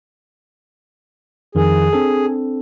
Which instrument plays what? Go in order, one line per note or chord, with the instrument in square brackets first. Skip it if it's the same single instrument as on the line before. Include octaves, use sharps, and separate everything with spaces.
[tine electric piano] F2 D#3 F3 [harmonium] G#4
[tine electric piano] C4 D4 A4